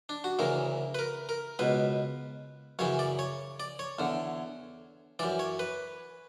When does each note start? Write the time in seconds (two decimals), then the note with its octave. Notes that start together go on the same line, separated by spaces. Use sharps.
0.09 D4
0.24 F#4
0.39 D2 C#3 E3 A#4
0.95 B4
0.99 A#4
1.29 A#4
1.59 C#2 B2 B4
2.79 F#2 C#3 E3 C#5
2.99 D5
3.19 C#5
3.60 D5
3.79 C#5
3.99 E2 D3
5.19 F#2 E3 D5
5.39 C#5
5.59 B4